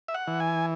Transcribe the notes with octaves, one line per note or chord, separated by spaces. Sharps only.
E5
F#5
E3
G#5